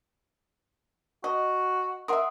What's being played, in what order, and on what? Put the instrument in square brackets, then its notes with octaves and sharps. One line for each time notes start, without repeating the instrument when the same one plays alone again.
[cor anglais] F#4 [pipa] D#5
[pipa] A#4 E5 [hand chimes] F#5 C6 D#6